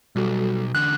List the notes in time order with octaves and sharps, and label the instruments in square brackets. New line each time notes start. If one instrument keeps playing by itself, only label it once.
[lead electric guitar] B1 [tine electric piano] G3 F#4 A4
[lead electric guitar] E2 D3 [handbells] F#6